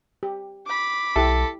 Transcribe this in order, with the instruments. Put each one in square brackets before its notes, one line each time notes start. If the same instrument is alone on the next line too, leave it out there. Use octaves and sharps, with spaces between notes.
[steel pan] G4
[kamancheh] B5 D6
[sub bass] B1 [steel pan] E4 G4 E5 [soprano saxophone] A4